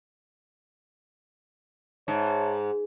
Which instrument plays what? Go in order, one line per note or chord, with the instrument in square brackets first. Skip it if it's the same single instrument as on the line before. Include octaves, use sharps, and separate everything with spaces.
[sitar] G#2 [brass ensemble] C#5 E5 A5